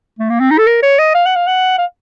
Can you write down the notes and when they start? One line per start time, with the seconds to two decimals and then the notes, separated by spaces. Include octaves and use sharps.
0.19 A3
0.30 A#3
0.40 C4
0.51 D#4
0.58 A4
0.67 A#4
0.83 C#5
0.99 D#5
1.15 F5
1.26 F#5
1.36 F5
1.47 F#5
1.79 F5